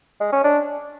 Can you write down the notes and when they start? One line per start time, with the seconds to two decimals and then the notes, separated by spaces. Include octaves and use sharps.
0.21 G#3
0.32 C#4
0.44 D4